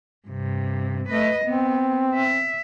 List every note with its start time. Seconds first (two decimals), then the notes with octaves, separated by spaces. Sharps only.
0.28 G2 C3
1.09 A3 B4 D#5
1.44 B3 C4
2.14 E5